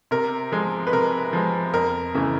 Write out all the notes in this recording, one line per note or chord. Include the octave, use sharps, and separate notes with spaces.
C3 A#4
F3 G#3
B4
C3 A#4
F3 G#3
F2 A#4
C#3 E3 A3